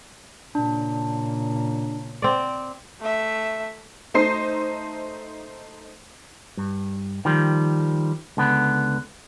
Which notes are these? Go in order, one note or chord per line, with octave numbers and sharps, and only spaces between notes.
A#2 C#3 D4
C4 D5
A3 E5
A3 D#4 C5 C7
G2
D#3 F3 G3
C#2 D3 B3